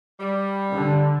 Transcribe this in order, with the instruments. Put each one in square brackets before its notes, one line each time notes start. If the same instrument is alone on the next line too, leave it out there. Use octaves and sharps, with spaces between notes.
[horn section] G3
[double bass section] D3